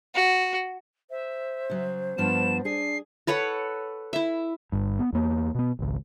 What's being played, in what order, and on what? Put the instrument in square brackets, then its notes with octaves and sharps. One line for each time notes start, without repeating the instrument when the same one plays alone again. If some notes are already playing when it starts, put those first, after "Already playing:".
[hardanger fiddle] F#4
[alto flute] C5 [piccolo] E5
[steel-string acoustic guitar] C#3 F#3
[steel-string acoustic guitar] G2 F3 D4 [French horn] B3 [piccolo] E7
[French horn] D4 [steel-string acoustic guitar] G#4 [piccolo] C7
[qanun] A4 B4 C#5 F#5
E4 E5
[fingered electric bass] G1 G2
B3
E2 A#3
B2 B3
G#1 C#2